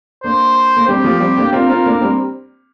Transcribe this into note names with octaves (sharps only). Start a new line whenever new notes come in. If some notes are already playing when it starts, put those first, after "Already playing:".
A#3 D4 C5
A#3
G3 C4 G4
F3 A#3
G3 C4
A#3 D4
C4 F4 A#4
C4 F4
A#3 D4
G3 C4